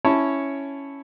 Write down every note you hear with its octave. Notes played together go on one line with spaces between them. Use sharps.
C#4 E4 C#5 A5